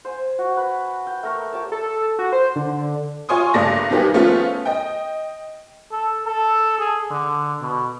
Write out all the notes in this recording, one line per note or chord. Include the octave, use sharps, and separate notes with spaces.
C5 G#5
F#4
B4
G5
A3 A#4 C#6
G4 C#5 A5
A4
F#4
C5
D3
F4 C#5 G#5 C6 C#6 D#6
F#1 G2 A3 D5 A5 A#6
B1 D#3 G3 B3 G4 G#4
F3 A3 B3 C#4 F4
D#5 G5
A4
A4
G#4
D3
B2